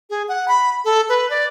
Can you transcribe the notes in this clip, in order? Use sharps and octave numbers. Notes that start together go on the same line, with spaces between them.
G#4
F#5
B5
A4
B4
D5